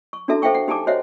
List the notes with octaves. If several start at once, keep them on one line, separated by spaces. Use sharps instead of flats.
C#6
D4 E4 F#4 A4 E5 A5
A4 C5 E5 F5 G5 C#6
F#5
D#4 G4 G#5 A5 D6
F#4 C5 C#5 D#5 E5 F#5